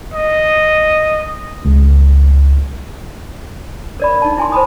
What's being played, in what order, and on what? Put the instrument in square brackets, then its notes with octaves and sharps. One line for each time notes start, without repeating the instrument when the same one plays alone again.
[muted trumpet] D#5
[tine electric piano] C#2
[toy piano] A#4 D5 B5
D#4 A5
E4 G#5 C6
C5 A5 B5 D#6